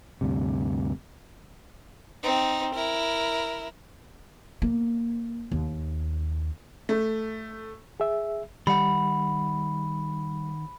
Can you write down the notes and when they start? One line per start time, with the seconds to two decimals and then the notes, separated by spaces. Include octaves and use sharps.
0.21 D2 G2 C3
2.23 C4 D#4
2.75 E4 A#4
4.62 A#3
5.51 D#2
6.89 A3
8.00 G#4 E5
8.67 D#3 G3 F#5 B5